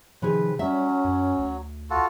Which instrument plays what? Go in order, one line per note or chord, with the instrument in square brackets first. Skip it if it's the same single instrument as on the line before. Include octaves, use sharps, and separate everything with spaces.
[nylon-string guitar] C3 D#3 G#4 [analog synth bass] F3 [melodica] B4
[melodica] F#3 [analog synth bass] G3 [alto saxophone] C#4 [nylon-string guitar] E5
[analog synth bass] F#2
D2
[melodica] F4 F#4 A4